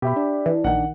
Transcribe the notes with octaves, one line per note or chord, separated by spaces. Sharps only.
B2 G4 E5 B5
D4
E3
A#1 D#3 F#5